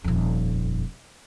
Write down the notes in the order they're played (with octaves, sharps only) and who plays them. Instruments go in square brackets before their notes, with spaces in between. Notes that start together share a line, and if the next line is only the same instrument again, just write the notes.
[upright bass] D#1 F2